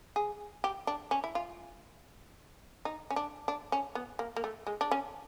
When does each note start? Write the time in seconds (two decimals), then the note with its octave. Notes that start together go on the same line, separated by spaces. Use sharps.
0.16 G#4
0.64 G4
0.87 D4
1.11 C#4
1.24 E4
1.35 F4
2.85 D#4
3.10 C#4
3.16 D4
3.48 D4
3.72 C#4
3.95 B3
4.19 A#3
4.36 A#3
4.44 A3
4.67 G#3
4.81 D4
4.91 C#4